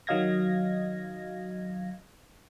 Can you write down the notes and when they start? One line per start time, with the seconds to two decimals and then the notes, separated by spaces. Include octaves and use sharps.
0.07 D#3 F#3 D#5 F5 G#6 A#6